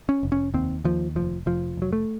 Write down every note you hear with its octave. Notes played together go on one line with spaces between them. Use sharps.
C#4
F1
C#4
D#2 C4
D#2 F3
F1 F3
F1 F3
F1 F#3
A3